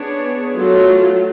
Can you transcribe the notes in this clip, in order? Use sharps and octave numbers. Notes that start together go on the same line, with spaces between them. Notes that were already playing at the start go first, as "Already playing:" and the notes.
Already playing: B3 D4 G#4 C#5
F#3 A3 F4